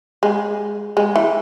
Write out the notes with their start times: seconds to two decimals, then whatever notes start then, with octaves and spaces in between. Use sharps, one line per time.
0.23 G#3
0.97 G#3
1.16 E3